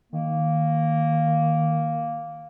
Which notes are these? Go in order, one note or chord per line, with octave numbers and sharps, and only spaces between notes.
D#3 A#3